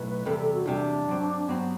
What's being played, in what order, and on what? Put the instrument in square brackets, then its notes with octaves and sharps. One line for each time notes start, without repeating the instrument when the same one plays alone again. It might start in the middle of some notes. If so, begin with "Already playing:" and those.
Already playing: [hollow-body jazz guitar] B1 A2 [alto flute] B4
[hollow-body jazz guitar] E2 C3 G3 [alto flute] A4
[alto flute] A4
F#4
[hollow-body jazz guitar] E2 C3 G3 [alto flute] D4
[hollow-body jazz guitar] G2 F#3 C4
[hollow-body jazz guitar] G2 F#3 C4 [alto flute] B3